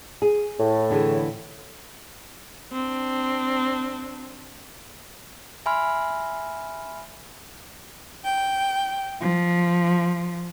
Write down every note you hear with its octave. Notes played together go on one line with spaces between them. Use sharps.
G#4
A2
D3 E3 G#4
C4 D4
E5 G#5 B5 C6 F6
G5
F3